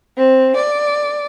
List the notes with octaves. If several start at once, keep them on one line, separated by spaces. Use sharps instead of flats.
C4
D5